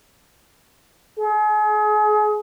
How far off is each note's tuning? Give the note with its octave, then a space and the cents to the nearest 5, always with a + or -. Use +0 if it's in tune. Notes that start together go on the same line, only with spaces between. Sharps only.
G#4 +35